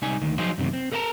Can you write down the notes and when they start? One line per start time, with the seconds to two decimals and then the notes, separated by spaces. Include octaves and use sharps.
0.02 C2 G3 D#4 G#5
0.21 D2 D#3
0.38 F3 F#3 D#4 F4 G#4 C5
0.58 F#2 C3 D#3
0.73 C4
0.92 A4 A#4 E5 F#5 A5 A#5